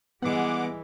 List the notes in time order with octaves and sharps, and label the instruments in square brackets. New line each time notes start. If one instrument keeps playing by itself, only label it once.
[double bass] E3 [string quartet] G3 G#3 [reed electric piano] B3 [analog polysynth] F#5 D6